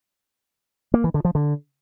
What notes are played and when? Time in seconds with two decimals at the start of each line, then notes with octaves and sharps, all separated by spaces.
0.94 A#3
1.04 E3
1.14 D3
1.25 F3
1.35 D3